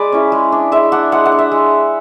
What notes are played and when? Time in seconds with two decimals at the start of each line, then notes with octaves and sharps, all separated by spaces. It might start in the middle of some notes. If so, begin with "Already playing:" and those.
Already playing: G#3 G#4 B4 D5
0.12 C#4 E4
0.32 G#3
0.52 D4
0.72 G#3 E5
0.92 D4 F#5
1.12 G#3 F#5
1.25 F#5
1.32 D4
1.39 E5
1.52 G#3